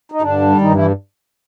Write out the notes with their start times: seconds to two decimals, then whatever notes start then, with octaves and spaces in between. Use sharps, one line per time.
0.12 D#4
0.22 G2 D3 D4
0.42 G3
0.61 G2 D#3 D#4
0.74 E3 E4